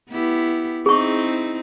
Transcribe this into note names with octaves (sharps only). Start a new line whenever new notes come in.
B3 E4 G4
C4 D#4 E4 G#4 C#6